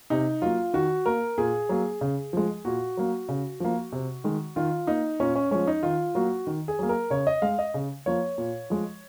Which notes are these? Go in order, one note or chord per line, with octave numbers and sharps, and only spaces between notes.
C3 D#4
F#3 A#3 F4
D#3 F#4
A#3 A#4
A#2 G#4
F#3 A#3
C#3
F3 G#3
A#2 F#4
F#3 A#3
C#3
F3 A#3
C3
D#3 G#3
D#3 F4
A#3 D#4
A#2 C#4
C#4
F3 G#3 C#4
D#4
D#3 F4
F#3 A#3 F#4
D#3
G#4
F#3 A#3
A#4
C#3 C#5
D#5
G#3 F5
D#5
C#3
F3 A#3 C#5
A#2
F3 G#3